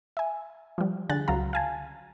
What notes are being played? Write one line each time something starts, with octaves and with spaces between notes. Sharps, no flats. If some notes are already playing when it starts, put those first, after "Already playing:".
E5 G#5
F3 G3
D3 G#4 F#6 A6
C#2 F#3 F5 A#5
F5 G#5 A5